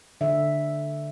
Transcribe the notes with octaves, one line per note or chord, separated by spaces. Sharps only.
D3 E5